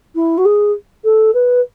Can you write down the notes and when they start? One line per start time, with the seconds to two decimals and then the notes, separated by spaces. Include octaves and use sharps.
0.15 E4
0.38 F#4
0.45 G#4
1.04 A4
1.34 B4